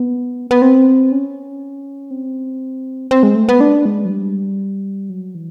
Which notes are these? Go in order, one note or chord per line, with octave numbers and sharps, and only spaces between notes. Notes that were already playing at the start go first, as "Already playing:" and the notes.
Already playing: B3
B3
C4
C#4
C4
C4
G#3
A3
B3
D4
G#3
F#3
G3
F#3
E3